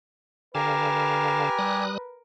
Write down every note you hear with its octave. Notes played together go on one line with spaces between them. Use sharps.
D3 G4 A#4 B4 F5 G#5 A5
G3 D#6 F#6